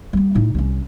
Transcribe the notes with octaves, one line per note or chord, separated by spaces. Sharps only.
G3 B3
A2 D#4
C2 C#4